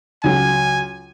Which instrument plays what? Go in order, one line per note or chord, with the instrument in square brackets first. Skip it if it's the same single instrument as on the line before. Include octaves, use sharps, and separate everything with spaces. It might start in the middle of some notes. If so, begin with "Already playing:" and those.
[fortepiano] C#2 F#3 [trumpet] G#5